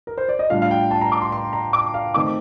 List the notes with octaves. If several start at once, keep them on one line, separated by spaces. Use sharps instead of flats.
A#4
C5
D5
D#5
A2 G3 D4 F4 F5
F5
G5
A5
A#5
D6
C6
C6
A#5
D6
F5
D#3 A3 C4 D#4 D6